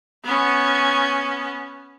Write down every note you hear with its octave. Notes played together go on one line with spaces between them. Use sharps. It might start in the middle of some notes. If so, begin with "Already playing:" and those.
B3 C#4